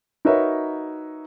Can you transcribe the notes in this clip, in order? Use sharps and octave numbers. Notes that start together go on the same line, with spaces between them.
D#4 F#4 A#4 B4 C#5 E5